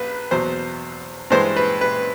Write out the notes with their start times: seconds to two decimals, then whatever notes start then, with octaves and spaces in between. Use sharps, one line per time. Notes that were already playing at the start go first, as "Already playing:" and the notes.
Already playing: A#1 B4
0.31 E2 B2 F#3 C5
1.30 G2 E3 G#3 C5
1.56 B4
1.81 B4